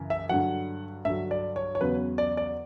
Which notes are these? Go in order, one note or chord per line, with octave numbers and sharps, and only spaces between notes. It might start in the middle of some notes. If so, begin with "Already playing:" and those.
Already playing: F#2 C#3 E3
E5
G2 D3 F#3 F#5
G2 D3 F#3 E5
D5
C#5
C#5
E2 C#3 F#3 B4
D5
D5